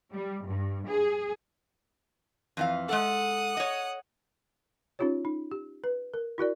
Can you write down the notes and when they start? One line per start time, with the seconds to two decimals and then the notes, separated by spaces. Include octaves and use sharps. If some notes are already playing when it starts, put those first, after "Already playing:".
0.12 G3
0.45 G2
0.87 G#4
2.57 F2 E3 F5
2.89 G#3 A4 F#5 D#6
3.57 C#5 D#5
4.99 C#4 D#4 F4 G4 C#5
5.25 D#4
5.52 G4
5.84 B4
6.14 A#4
6.38 E4 F#4 A#4 D5